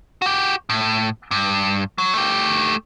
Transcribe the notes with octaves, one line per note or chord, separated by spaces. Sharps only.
F#4 G4
A2
G2
F#3
A3 G4